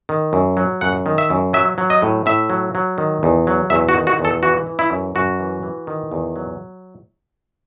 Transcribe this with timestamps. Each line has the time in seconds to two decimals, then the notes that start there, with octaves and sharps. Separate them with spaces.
0.09 D#3
0.33 F#2
0.57 F#3
0.81 F#2 F#5
1.06 D#3
1.18 E5
1.30 F#2
1.53 F#3 E5
1.78 F#3
1.90 D#5
2.02 A2
2.26 A2 E5
2.50 F#3
2.75 F#3
2.98 D#3
3.23 E2
3.47 F#3
3.70 E2 E5
3.89 F#4
3.95 D#3
4.07 F#4
4.19 E2
4.25 A4
4.43 E3 F#4
4.67 E3
4.79 E4
4.91 F#2
5.15 F#2 F#4
5.39 E3
5.63 E3
5.87 D#3
6.12 E2
6.36 F#3